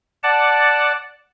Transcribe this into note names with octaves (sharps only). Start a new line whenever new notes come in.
D5 F#5 A5